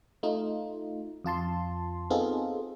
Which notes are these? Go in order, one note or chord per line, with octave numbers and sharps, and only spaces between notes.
A3 D#4 F4
F2 F4 A5 C6
B3 C4 D#4 F4 G#4 A4